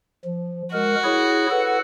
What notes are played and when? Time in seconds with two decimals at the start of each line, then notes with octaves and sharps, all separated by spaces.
0.25 F3
0.73 G#3 F#4 A#4
1.04 E4 G#4 C#5
1.50 A4 B4 F#5